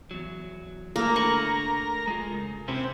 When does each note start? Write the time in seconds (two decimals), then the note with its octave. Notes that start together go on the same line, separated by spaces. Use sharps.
0.11 E2 F#3
0.96 A3 A#3 A#4
1.16 D2 D3 B5 C#6
2.07 G#3 F4
2.31 C#3
2.68 C3 C#4 E4 G4